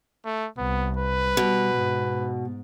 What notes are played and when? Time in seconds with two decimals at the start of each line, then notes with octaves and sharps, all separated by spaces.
0.25 A3
0.58 C2 B3
0.96 B4
1.37 B2 G3
1.75 G#2